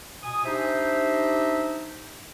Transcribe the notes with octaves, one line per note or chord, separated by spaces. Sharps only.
B2 G#5 D#6
D4 D#4 G4 C5 E5